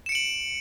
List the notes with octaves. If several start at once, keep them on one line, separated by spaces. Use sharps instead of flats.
C#7 D7 E7 F#7